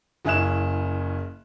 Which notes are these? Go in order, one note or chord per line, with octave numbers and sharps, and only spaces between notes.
F#1 C#3 C#4 E4 F#6 E7